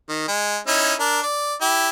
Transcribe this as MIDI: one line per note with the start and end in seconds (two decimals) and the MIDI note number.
0.09 0.24 51
0.28 0.58 56
0.67 0.94 61
0.67 0.94 63
0.67 0.94 64
1.00 1.21 62
1.00 1.21 70
1.23 1.54 74
1.61 1.89 64
1.61 1.89 67